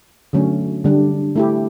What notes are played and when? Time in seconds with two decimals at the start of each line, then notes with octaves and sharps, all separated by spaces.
0.33 D3 F#3 A3 C#4
0.84 D3 G3 D4
1.36 A3 E4 G4